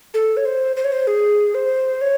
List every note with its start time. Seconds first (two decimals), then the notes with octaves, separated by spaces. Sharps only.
0.14 A4
0.37 C#5
0.46 C5
0.77 C5
0.84 C#5
0.92 C5
1.07 G#4
1.55 C5
2.01 C#5